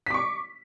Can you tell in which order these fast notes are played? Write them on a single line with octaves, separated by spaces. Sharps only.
B6 D6 C#6